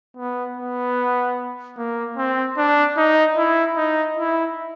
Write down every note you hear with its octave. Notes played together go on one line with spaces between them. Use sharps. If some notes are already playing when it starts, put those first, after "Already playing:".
B3
B3
A#3
C4
D4
D#4
E4
D#4
E4